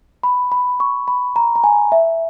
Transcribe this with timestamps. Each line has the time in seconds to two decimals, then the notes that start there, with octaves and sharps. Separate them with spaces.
0.23 B5
0.52 B5
0.80 C#6
1.08 B5
1.36 A#5
1.56 A#5
1.64 G#5
1.92 E5